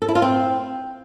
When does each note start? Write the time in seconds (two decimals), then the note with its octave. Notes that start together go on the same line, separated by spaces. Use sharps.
0.02 A4
0.08 E4
0.15 F4
0.22 C4